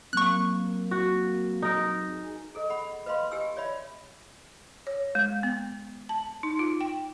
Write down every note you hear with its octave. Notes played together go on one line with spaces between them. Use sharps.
F#3 A#3 C4 C#6 F#6
F#4
D#4 A#4
G#4
G#4 A4 D#5
F#5 B5
B4 D#5 F5 B5 C6
G4 D#5 G#5 E6
C#5 D5 E5 B5
C#5
G#3
B3
A5
D#4
F4
G5